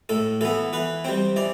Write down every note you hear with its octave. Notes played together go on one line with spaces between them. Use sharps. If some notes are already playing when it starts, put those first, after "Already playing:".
A2 A4
E3 B3 A4
E3 B4
G3 C4 C5
E3 D5